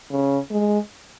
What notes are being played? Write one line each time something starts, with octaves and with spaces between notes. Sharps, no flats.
C#3
G#3